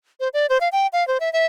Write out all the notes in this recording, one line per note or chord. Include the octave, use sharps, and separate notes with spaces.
C5
D5
C5
F5
G5
F5
C5
E5
E5